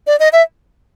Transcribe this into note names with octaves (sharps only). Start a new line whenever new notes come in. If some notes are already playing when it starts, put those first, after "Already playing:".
D5
D#5
E5